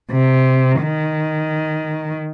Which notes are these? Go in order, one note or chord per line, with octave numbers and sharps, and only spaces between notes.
C3
D#3